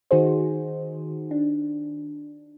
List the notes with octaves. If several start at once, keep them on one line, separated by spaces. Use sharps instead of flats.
D#3 D#4 F#4 G#4 C5
D4